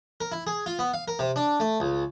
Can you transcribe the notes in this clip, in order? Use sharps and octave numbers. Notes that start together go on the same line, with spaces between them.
A#4
E4
G#4
F4
B3
F5
A#4
C3
D4
A3
C#2